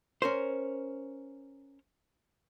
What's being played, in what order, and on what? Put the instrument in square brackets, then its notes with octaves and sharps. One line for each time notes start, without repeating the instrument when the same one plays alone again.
[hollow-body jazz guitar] C#4 A#4 C5